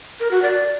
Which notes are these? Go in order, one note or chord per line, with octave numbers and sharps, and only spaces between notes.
A#4
F#4
D5